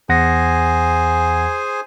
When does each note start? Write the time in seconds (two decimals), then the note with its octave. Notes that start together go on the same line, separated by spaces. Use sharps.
0.09 E2 G#4 C5 F#5 G#5 A#6